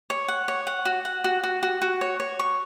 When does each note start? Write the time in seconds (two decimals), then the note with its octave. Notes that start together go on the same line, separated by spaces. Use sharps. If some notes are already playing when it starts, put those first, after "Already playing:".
0.10 C#5
0.28 F#5
0.48 C#5
0.67 F#5
0.85 F#4
1.05 F#5
1.24 F#4
1.44 F#4
1.63 F#4
1.82 F#4
2.01 C#5
2.20 C#5
2.39 C#6